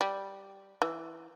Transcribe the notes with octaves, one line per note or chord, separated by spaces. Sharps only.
G3
E3